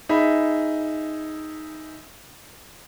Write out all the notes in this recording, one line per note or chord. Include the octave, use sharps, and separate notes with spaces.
D#4 G#4 E5 B5